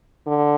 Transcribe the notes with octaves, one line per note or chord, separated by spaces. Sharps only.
D3